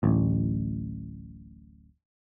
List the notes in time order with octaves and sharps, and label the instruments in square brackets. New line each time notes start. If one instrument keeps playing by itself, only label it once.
[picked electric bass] D1 A1